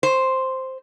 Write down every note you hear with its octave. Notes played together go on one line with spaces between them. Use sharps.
C5